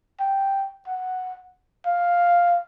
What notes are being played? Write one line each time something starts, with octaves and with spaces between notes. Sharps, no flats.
G5
F#5
F5